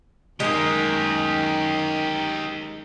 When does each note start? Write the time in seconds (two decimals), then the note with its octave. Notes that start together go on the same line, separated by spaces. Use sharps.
0.40 F#2 D#3 G#3 A#3 G4 A#4